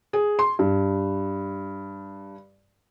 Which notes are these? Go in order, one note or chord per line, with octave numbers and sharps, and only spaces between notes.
G#4
C6
G2